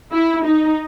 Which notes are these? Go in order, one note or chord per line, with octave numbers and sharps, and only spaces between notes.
E4
D#4